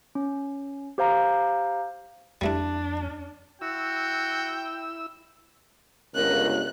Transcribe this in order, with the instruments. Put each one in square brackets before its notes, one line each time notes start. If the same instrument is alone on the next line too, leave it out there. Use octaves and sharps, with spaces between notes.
[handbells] C#4
G4 C5 F5 A#5
[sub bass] F2 [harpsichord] G3 A3 E4 [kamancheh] D4
[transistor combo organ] E4 E6 [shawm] F#4 [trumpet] G5
[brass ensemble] G1 C#2 [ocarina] A#4 [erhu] F#6